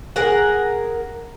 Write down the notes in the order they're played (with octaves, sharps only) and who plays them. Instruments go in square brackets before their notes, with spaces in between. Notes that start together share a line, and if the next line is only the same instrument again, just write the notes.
[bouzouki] G#4 A#4 F#5